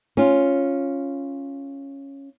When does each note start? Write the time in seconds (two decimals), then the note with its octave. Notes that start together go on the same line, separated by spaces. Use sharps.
0.17 C#4 F4